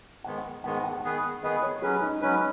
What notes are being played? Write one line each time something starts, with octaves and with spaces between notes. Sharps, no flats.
G#2 D#3 G#3 B3 F#5
G#2 D#3 G#3 B3 F#5
F#5
D#3 B3 G#4 B4
D#3 B3 G#4 B4 D#5
C#5
F#3 C#4 G#4 B4
D#4
F#3 C#4 D#4 B4